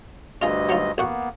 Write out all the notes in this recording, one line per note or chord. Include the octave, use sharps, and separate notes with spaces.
D2 G2 F4 G#4 D#5
F#3 D#4 F4
A1 A#3 B3 F#4 F#5